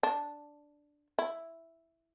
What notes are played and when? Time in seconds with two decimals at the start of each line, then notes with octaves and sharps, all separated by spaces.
0.03 D4
1.19 E4